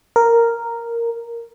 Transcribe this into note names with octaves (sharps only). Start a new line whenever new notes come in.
A#4